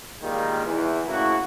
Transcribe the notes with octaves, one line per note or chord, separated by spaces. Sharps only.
A#2 D#3 G3 G#3 A#3 F4
E2 E3
A2 C#3 A#3 E4 F#4